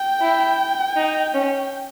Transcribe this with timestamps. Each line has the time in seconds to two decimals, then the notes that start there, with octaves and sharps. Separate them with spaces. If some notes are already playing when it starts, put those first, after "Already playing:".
Already playing: G5
0.21 E4
0.96 D#4
1.33 C#4